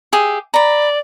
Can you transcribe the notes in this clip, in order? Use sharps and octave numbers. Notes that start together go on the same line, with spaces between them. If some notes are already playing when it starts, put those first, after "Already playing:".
G4 G#4 E5
D5 A#5 B5